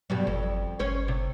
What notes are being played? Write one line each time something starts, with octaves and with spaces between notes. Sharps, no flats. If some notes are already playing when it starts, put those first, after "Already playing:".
G2 B2 F#3 G3
G1 F2
G1 C#4 C5 C#5
C3